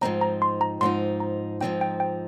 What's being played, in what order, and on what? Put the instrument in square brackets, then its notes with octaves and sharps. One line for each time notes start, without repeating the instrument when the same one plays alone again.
[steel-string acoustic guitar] G#2 F3 C4 D#4 [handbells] A#5
[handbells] A#5
C6
A#5
[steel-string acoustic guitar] G#2 F3 C4 D#4 [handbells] C6
[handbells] A#5
[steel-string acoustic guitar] G#2 F3 C4 D#4 [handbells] G5
[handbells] G5
G5